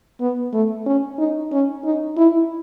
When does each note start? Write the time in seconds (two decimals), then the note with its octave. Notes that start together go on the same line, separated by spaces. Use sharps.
0.20 B3
0.53 A3
0.86 C#4
1.18 D#4
1.52 C#4
1.85 D#4
2.17 E4